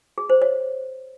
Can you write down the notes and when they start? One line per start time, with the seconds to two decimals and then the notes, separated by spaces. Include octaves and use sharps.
0.18 G#4
0.30 C5
0.42 C#5